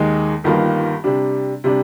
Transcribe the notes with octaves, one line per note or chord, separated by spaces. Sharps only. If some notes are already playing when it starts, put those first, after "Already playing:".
Already playing: D#2 D#3 G#3 D#4
G1 G2 D#3 A#3 F4
C3 G3 D4
C3 G3 D4